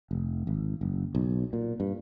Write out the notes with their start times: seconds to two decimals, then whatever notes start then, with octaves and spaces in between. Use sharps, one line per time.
0.11 F1
0.47 G#1
0.81 F#1
1.15 B1
1.53 A#2
1.80 G2